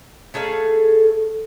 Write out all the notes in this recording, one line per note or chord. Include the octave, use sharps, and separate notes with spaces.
A3 G#4 A4 F5